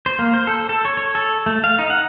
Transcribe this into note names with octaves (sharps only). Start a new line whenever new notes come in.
C5
A#3
C5
A4
A4
C#5
C#5
A4
A3
F5
D#4
F#5